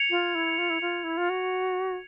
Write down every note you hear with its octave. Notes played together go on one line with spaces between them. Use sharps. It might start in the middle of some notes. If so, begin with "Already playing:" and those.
Already playing: G#6 C#7 F7
F4
E4
F4
E4
F4
E4
F4
F#4